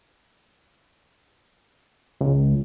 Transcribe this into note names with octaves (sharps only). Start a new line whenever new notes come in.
C#2